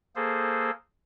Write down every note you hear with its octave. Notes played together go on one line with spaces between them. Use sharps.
A#3 G#4 A4 C5